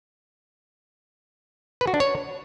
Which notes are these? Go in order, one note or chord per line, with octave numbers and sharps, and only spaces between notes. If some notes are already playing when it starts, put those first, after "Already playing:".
B4
F#4
D4
C#5